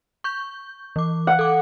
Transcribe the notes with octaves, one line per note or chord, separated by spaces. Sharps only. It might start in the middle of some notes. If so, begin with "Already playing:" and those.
C#6 G6
E3 D6
F#5
A4 D6